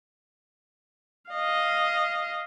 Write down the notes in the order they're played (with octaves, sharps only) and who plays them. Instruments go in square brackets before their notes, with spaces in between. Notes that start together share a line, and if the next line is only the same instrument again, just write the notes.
[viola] D#5 F5